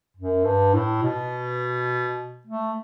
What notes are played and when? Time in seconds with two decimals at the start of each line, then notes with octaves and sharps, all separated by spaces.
0.17 F#2
0.45 G2
0.74 A2
1.03 B2
2.47 A3